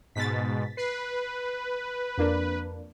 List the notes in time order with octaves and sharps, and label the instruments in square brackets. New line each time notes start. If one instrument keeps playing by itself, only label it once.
[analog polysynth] G#2 B2 [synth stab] A6 B6
[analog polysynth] B4 [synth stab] C7
[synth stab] F2 A#3 D4